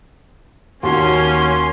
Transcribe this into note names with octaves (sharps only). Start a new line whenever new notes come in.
D#2 A#3 C#4 F#4 C6